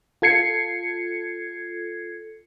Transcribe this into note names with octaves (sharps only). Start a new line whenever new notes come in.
F4 A4 G#6 C7 C#7